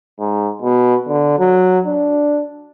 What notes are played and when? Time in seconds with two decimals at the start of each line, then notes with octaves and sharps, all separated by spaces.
0.19 G#2
0.62 B2
1.08 D3
1.39 F#3
1.86 D4